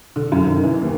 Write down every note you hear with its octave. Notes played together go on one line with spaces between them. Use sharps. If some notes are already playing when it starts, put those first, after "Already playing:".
D3
F#2
D#3
E3
D#2